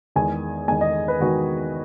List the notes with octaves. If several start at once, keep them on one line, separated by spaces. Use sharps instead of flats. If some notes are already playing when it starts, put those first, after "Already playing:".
E2 D#3 G#3 G#5
E2 D#3 G#3 G#5
D#5
B4
E2 D#3 G#3 F#4